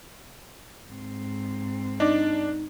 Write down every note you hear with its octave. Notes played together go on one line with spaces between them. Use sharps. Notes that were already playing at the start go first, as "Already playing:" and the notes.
G#2 C4
D4 D#4 D5